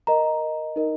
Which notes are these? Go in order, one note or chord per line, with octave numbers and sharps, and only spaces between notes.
A#4 D#5 A#5
D#4 A#4 D#5